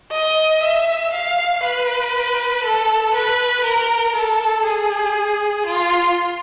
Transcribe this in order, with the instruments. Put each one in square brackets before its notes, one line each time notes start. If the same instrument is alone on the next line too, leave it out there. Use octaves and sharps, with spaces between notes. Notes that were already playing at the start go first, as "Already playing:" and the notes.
[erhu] D#5
E5
F5
B4
A4
B4
A#4
A4
G#4
F4